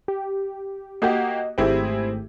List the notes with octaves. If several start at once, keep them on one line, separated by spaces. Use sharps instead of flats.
G4
A#3 F#4 G4 D#5
G#1 A3 C4 E4 G4 G#4